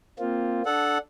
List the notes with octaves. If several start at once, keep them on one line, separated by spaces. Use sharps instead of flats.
A#3 C4 F4
D4 A4 F#5